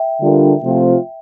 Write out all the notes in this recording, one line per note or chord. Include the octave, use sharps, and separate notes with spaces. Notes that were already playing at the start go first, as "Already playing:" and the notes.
Already playing: E5 G5
D3 G3 D4 F4 A#4
C3 F3 A3 C4 F4